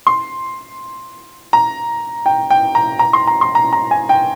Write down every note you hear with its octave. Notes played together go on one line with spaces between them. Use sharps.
C6
A#5
G5
G5
A#5
A#5
C6
A#5
C6
A#5
A#5
G#5
G5